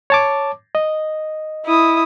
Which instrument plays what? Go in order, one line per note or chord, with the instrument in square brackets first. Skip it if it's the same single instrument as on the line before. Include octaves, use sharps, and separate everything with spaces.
[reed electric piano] C#5 A5 D6
D#5
[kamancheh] E4 D#6